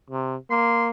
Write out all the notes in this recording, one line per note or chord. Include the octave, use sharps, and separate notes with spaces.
C3
A#3 C6